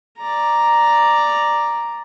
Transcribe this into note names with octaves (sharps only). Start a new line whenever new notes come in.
D5 A#5